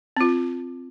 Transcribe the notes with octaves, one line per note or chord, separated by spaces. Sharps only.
C4 F4